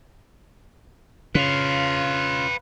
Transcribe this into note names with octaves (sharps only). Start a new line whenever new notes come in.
C#3 F4 B4 F5